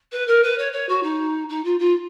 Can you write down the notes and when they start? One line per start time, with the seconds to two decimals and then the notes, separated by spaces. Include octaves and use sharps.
0.12 B4
0.27 A#4
0.43 B4
0.58 C#5
0.72 C#5
0.89 F#4
1.03 D#4
1.49 D#4
1.64 F4
1.79 F4